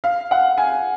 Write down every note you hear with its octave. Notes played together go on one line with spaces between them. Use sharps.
F5
F#5
G#5